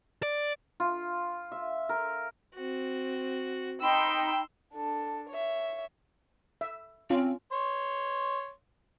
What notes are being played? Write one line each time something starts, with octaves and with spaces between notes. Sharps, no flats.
D5
F4
E5
A#4
C4 F#4
D#4 G5 B5 C6 E6
D4 A4
C#5 E5
E5
C4 C#4 F4
C#5 C6